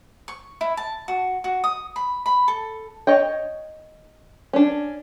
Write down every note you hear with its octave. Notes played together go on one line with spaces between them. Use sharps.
C#6
E4
A5
F#4
F#4
D#6
B5
B5
A4
C#5 D#5 G5
C#4 D4